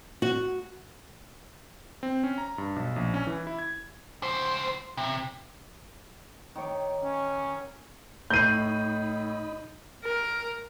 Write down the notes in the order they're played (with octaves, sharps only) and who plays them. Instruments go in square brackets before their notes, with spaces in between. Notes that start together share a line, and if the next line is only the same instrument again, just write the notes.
[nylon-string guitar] F#4
[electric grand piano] C4
C#4
A#5
G2
B1
A#1
C#4
E3
E4
G#6
[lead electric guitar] C#2 C5
C3
[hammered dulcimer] D#3 C#5 D6
[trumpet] C#4
[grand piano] A2 C7 [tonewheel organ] D#4 D#5 B5 [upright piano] G6 D#7
[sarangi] A#4